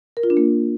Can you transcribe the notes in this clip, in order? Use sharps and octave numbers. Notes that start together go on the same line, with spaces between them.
A#4
F4
D4
A#3